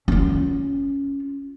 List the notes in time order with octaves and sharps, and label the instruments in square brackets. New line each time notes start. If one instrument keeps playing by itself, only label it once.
[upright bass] C#4 F4